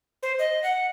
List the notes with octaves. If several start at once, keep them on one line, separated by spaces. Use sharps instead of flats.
C5
D#5
F#5